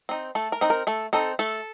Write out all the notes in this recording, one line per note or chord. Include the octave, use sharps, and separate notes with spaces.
C4 D#4
A3 A4
A#4
C4 D#4
A#4
A3 A4
C4 D#4 A4
A3 A4